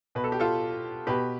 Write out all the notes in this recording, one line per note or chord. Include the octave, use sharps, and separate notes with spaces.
B2 B4
A4
G4
F4 A4
B2 G4 B4